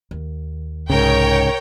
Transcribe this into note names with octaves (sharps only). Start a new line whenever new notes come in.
D#2
C2 G#2 C#3 A#4 C#5 G5